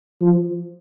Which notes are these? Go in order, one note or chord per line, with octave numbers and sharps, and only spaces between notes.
F3